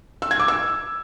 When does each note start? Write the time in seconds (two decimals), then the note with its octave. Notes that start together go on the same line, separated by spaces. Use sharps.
0.22 E6
0.31 G#6
0.40 D6
0.48 E6